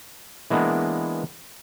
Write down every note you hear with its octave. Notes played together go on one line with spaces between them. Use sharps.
E3 G#3 A#3 B3 D4